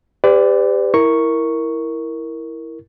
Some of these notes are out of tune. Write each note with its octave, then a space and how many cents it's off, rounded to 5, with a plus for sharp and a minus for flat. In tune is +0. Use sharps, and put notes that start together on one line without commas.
G4 +20 B4 +45 D5 -5
E4 -5 A#4 +0 C#6 +0